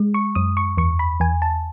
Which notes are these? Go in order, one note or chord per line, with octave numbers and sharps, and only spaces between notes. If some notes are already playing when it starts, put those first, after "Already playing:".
Already playing: G#3
C#6
F#2 D#6
C#6
E2 C#6
B5
E2 G#5
A5